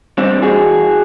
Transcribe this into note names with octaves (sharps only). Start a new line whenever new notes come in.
G3 C4 D4
E2 F#4 G#4